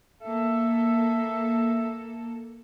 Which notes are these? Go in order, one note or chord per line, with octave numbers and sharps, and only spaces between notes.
A#3 A4 E5